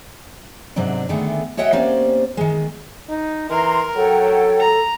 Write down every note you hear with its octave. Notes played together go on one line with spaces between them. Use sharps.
G#2 C3 F#3 D4 D5
D3 D#3 G#3 A3 B3
F#4 C#5 D#5 E5 F#5 G5
A#3 C4 C#4 G4 C5 D5
D#3 G#3
D#4
E3 A#4 A#5 C6
F#3 A4 C#5 F#5 G5
A#5